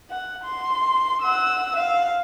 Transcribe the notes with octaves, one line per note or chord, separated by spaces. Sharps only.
F#5
C6
F#5 E6
F5